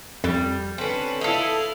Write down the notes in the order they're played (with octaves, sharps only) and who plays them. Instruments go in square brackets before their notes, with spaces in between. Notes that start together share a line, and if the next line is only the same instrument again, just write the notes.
[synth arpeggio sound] F2 [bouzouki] G3
[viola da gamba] D3 B4 [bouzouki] C4 C#4 [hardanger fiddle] A4
[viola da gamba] E4 [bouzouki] A4 D#5 [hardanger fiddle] F5